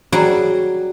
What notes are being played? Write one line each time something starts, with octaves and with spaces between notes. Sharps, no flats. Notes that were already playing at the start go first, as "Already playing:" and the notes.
F#3 G3 F#4 G#4